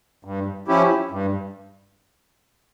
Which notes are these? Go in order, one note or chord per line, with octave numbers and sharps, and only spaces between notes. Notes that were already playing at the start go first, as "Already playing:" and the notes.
G2
F3 C#4 E4 G4
G2